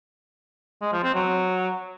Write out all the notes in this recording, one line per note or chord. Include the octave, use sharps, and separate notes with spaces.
G#3
F3
C4
F#3